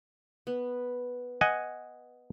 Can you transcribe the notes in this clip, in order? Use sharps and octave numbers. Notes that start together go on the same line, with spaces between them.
B3
D#5 F#5 G#5